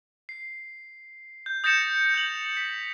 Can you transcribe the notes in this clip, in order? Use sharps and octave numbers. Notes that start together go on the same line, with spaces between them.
C7
G6
D#6 G6 A6 A#6 C#7 E7
G6 F7 F#7
B6